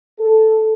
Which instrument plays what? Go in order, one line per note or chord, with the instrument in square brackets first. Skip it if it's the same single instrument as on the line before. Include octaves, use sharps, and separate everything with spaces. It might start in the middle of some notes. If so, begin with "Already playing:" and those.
[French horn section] A4